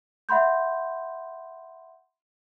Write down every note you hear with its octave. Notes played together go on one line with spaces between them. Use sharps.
E5 F#5 B5 C6 G6